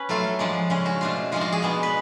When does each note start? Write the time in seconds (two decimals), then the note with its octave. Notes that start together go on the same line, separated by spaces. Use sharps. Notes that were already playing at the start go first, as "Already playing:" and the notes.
Already playing: C#4 B4
0.09 F#3 A3 F4 A4
0.39 F3 G#3 D4
0.70 C#3 G#3 C#4
0.86 F#4
1.01 B2 A3 D4 F4
1.32 F3 G#3 D4 F4
1.41 F#4
1.52 G#4
1.62 B2 G#3 B3 D4
1.83 B4